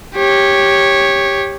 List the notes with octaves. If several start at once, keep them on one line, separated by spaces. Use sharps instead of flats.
G4 C#5